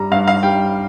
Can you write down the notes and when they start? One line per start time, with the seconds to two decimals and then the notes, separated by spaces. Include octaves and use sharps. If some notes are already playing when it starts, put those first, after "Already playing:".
Already playing: G2 G3 A#5
0.11 G2 F5
0.28 F5
0.43 G3 G5